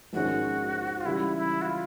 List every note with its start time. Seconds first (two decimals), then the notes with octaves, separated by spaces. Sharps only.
0.13 A#1 G#2 D#3 G#3 C#4 F#4
1.00 F4
1.05 C#3 E3 G3 E4
1.36 E4
1.61 F#4
1.66 F4